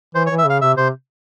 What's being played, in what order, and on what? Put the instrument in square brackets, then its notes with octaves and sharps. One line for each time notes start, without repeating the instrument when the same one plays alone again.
[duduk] E3 [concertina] C5
[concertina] C#5
[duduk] E3
[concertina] E5
[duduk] C#3 [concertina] F5
[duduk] C3 [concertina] E5
[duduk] C3 [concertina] C5